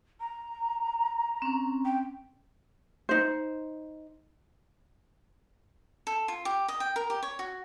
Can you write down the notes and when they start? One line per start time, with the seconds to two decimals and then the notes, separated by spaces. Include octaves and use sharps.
0.20 A#5
1.42 C4 C#4
1.85 G5
3.09 D#4 C5
6.07 A4
6.28 F4
6.45 G4
6.68 D#5
6.80 G5
6.96 A#4
7.10 G4
7.23 C#5
7.39 F#4